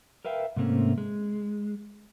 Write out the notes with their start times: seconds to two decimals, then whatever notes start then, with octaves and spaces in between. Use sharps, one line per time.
0.25 A#4 B4 E5 F5 G5
0.56 G#2 C3 A3 A#3 C4 C#4
0.98 G#3